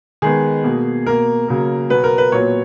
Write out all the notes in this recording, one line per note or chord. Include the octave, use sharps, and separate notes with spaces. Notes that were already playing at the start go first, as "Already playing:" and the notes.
D#3 G#3 B3 G#4
B2 A#3
B2 A#3 A#4
C#3 F#3 A#3
B2 F#3 B3 B4
A#4
B4
A#2 F#3 B3 C#5